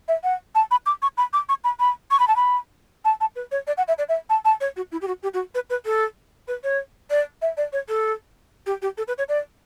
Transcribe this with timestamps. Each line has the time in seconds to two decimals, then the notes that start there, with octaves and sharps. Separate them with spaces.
0.08 E5
0.24 F#5
0.55 A5
0.71 B5
0.86 D6
1.02 C#6
1.18 B5
1.33 D6
1.49 C#6
1.64 B5
1.80 B5
2.11 C#6
2.20 B5
2.28 A5
2.36 B5
3.05 A5
3.21 A5
3.36 B4
3.52 C#5
3.67 D5
3.77 F#5
3.88 E5
3.98 D5
4.09 E5
4.30 A5
4.45 A5
4.61 C#5
4.76 F#4
4.92 E4
5.02 G4
5.08 F#4
5.23 G4
5.34 F#4
5.55 B4
5.70 B4
5.85 A4
6.48 B4
6.64 C#5
7.10 D5
7.42 E5
7.57 D5
7.73 C#5
7.89 A4
8.66 G4
8.82 G4
8.98 A4
9.08 B4
9.18 C#5
9.29 D5